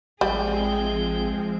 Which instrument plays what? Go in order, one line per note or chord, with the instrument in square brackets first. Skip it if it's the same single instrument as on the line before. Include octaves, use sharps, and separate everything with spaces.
[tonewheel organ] A1 G5 [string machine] F3 G#3 C4 [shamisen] G3 [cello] G#4